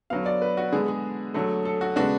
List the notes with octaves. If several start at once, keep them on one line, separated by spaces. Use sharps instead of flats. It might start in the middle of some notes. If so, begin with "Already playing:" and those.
D3 F#3 B3 F5
D5
B4
F#4
D3 G#3 B3 G#4
G#4
D3 F#3 A3
A4
F#4
C#3 G#3 B3 D4 F#4